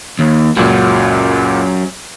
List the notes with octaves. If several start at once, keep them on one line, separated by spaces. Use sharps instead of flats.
D#2
C#2 F#2 A#2 F#3